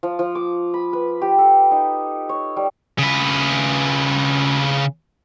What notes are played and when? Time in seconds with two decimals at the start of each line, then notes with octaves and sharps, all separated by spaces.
0.03 F3
0.19 F3
0.35 D6
0.74 B5
0.93 B4
1.22 G4
1.38 A4
1.71 D#4
2.29 C#5
2.57 G3
2.99 C#3 B4